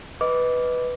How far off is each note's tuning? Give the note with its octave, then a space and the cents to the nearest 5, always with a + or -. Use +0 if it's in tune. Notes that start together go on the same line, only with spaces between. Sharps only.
B4 +0 D#5 +15 D6 -20